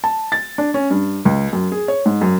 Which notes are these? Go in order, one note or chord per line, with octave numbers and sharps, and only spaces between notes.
A5
A6
D4
C#4
G2
C#2
F#2
G#4
C#5
G#2
F#2